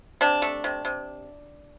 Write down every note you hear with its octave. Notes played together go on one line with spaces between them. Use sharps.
C3 D4
A3
C3
C3